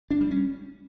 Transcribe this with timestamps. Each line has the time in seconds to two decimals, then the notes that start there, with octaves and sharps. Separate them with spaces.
0.11 D4
0.21 G3
0.31 C#4